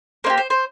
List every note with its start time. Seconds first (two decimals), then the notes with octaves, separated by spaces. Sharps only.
0.24 A#3 D#4 C5
0.30 G4
0.38 C5
0.50 C5